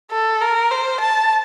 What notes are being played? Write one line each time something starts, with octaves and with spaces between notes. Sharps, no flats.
A4
A#4
C5
A5